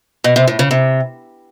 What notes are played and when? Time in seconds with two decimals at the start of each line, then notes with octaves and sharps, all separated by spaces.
0.24 B2
0.36 C3
0.48 A2
0.59 C#3
0.71 C3